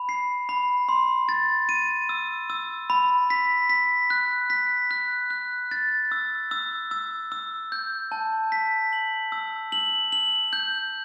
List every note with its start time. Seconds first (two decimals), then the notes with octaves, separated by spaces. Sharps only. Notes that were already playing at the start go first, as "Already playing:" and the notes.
Already playing: B5
0.09 C7
0.49 B5
0.89 C6
1.29 A6
1.69 D#7
2.09 E6
2.50 E6
2.90 B5
3.30 B6
3.70 B6
4.10 F#6
4.50 B6
4.91 F#6
5.30 F#6
5.71 A6
6.12 E6
6.51 E6
6.91 E6
7.32 E6
7.72 G6
8.12 A5
8.52 B6
8.93 F#7
9.32 E6
9.72 F#7
10.12 F#7
10.53 G6